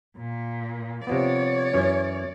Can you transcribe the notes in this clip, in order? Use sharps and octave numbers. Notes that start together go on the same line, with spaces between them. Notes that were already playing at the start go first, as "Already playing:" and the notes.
A#2
C3 F3 B3 C#5 D5
F#2 E3 C#4